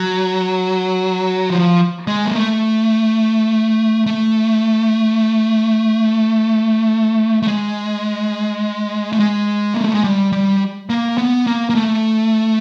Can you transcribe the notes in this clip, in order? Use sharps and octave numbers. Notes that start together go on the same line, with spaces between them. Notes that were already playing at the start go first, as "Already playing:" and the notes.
Already playing: F#3
F3
G#3
A#3
A3
A3
A3
G#3
A3
G#3
A#3
A3
G#3
G3
G3
A#3
B3
A#3
A#3
A3